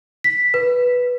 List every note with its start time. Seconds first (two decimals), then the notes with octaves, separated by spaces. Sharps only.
0.24 B6
0.54 B4